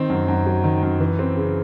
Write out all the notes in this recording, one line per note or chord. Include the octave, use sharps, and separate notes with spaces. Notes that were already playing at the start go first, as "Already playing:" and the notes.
Already playing: D#3 C4
F#2
F#2
F#3
D#3
F#2
E3
C4
C#3